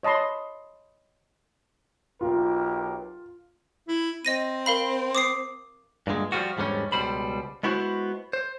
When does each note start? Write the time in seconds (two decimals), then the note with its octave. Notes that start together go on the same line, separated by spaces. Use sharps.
0.03 C#5 D#5 A5 B5 C6
2.21 B1 F4 G4 A#4
3.88 E4
4.25 C4 D#5 A#6 D#7
4.66 A#4 F5 B5
5.15 D6 D#6 C7
6.07 G2 A#2 D3 G#3
6.32 F3 G3 G#3 B3 F4 F#4
6.57 E2 G#2 D3 G3 C#4
6.92 C#2 B2 G3 C5 B5
7.63 G#3 B3 E4 F#4 C5
8.33 C5